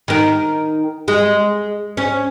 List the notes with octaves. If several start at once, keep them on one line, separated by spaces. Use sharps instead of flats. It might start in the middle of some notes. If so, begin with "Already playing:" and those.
D#3 A#4
G#3
C#4